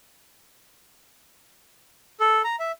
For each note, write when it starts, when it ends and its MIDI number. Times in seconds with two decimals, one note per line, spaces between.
2.20 2.42 69
2.44 2.56 82
2.59 2.72 76